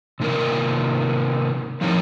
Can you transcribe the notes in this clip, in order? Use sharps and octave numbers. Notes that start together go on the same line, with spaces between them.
C3 D#3 A#3 F4 A#4
F3 C4 D#4 A#4 C#5